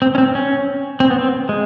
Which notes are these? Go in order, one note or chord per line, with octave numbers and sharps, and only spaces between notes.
C4
C#4
C4
C#4
C4
B3
C4
G#3